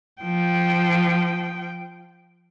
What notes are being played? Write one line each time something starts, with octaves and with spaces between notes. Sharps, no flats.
F3 G5